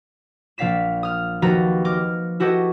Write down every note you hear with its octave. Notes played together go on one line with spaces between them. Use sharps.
A#1 D5 F5 B6 E7
D#6 F6
D#2 F3 F#4 B4 A#5 A6
D#5 D6 F6
E4 F#4 G4 A4 B4 D#5